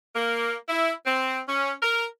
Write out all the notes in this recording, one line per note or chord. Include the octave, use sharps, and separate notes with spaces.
A#3
E4
C4
C#4
A#4